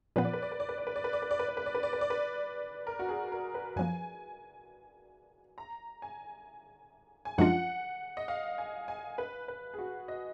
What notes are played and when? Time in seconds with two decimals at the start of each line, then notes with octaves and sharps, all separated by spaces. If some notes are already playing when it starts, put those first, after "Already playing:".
0.16 A#2 F3 B3 B4
0.25 D5
0.33 B4
0.42 D5
0.51 B4
0.60 D5
0.69 B4
0.78 D5
0.87 B4
0.96 D5
1.04 B4
1.13 D5
1.22 B4
1.31 D5
1.39 B4
1.49 D5
1.57 B4
1.66 D5
1.75 B4
1.83 D5
1.93 B4
2.01 D5
2.10 B4
2.87 A#4
2.99 F#4
3.09 G#4
3.32 A#4
3.55 B4
3.76 F#2 F3 A#3 G#5
5.58 A#5
6.02 G#5
7.25 G#5
7.38 F#2 F3 G#3 D4 F4 F#5
8.17 D#5
8.28 F5
8.58 G#5
8.88 G#5
9.18 B4
9.48 B4
9.74 G#4
9.79 F#4
10.08 D#5